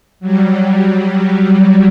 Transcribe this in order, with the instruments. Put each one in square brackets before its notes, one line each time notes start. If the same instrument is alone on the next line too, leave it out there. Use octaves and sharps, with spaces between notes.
[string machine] F#3 G3